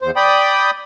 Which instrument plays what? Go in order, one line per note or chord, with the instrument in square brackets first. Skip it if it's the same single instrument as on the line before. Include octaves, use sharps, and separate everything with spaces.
[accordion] E2 C5
D5 G5 B5 D#6